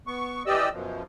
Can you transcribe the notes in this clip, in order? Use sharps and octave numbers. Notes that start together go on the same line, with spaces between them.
B3 C#6
E3 G4 D5 D#5 E6
F#2 B2 F3